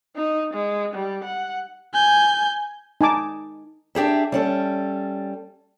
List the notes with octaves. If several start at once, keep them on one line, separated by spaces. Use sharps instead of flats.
D#4
G#3
G3
F#5
G#5 G6
D#4 G#5 A5 D6
D4 G4 G#4 E5
G3 C#4 A4